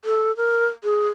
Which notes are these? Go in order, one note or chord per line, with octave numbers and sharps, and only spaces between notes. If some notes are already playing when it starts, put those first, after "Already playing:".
A4
A#4
G#4